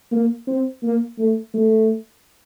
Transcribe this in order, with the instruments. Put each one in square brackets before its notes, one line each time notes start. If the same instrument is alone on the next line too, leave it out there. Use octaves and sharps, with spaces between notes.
[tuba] A#3
C4
A#3
A3
A3